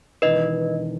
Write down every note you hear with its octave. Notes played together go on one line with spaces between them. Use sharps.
E1 E2 D#3 B4 D#5